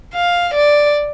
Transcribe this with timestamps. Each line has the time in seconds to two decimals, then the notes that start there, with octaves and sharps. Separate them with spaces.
0.14 F5
0.54 D5